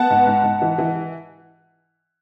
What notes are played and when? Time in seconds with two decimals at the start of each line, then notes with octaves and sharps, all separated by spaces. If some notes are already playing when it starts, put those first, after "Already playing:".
Already playing: B3 F#5 A5
0.10 G#2
0.27 G#2
0.43 G#2
0.62 E3
0.78 E3